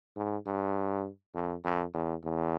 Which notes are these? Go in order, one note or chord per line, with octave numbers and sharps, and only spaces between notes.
G#2
G2
F2
F2
E2
E2